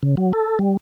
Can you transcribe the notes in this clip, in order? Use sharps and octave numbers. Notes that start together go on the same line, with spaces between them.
C#3
F#3
A4
G3